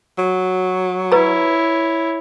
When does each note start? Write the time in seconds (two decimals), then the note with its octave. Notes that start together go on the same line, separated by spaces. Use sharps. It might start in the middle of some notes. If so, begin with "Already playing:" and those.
0.18 F#3
1.12 E4 B4 C#5 A#5